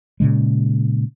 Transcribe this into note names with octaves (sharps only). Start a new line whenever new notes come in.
A#2 C#3 G#3